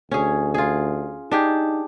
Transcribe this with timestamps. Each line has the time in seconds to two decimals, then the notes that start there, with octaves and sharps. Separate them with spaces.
0.11 D2 C#4 G#4
0.54 F4 G#4
1.31 D4 D#4 G4 G#4